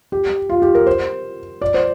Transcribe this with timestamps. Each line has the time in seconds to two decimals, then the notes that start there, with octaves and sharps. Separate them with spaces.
0.12 G4
0.49 F4
0.62 G4
0.75 A#4
0.86 C5
1.62 D5
1.74 C5